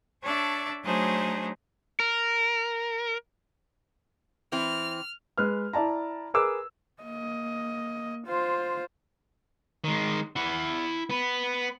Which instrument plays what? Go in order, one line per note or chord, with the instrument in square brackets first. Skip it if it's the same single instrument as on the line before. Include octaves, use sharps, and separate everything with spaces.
[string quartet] D4 A4 C#5 D5 E5
F#3 A3 D4 D#4 G#4 C5
[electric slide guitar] A#4
[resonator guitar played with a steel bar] E3 C4 E4 [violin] F6
[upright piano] G#3 B4 F6
E4 D5 A5 A#5
G#4 A#4 B4 D6 E6
[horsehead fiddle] A#3 D#5
F4 C5
[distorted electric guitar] D#3 G#3
E4 F#5
B3 B4